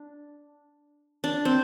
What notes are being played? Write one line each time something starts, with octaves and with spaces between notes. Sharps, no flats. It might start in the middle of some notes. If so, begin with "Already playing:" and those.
Already playing: D4
D4
C4